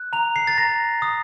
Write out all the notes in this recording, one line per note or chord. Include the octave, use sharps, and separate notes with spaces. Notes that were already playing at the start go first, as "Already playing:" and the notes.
Already playing: F#6
A#5 F7
C7
A6
A#5 A#6
D#6